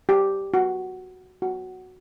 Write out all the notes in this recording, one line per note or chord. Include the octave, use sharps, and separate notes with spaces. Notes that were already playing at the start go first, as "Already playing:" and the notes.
G4
F#4
F#4